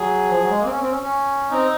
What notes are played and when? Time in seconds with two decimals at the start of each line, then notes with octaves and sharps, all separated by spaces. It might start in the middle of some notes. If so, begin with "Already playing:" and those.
Already playing: F#3 G#4
0.28 F3
0.39 F#3
0.49 G#3
0.59 A#3
0.64 C4
0.69 C#4
0.80 C4
0.89 C#4
1.00 C#4
1.51 C4 D#4